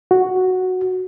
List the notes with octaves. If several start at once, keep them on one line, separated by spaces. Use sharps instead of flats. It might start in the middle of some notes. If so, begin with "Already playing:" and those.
F#4